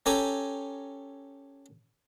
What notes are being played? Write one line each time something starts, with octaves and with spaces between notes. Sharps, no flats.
C#4 G4 A4 G#5 A#5